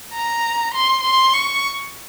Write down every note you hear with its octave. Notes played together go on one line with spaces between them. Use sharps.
A#5
C6
C6
C#6